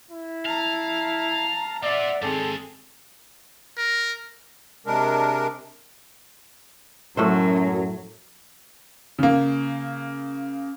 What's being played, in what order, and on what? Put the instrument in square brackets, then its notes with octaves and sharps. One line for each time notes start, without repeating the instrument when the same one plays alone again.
[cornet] E4
[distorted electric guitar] F5 [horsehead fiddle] A5 A#5
[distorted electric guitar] A#3 F4 [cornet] D5 [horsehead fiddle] E5 F#5
[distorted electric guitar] G#2 D#3 [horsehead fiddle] C4 G#4 [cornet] A4
[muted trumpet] A#4
[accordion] C3 G#3 D4 A#4
[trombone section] F#2 [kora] A2 A3 C5 [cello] F#3
[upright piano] C#3 A#3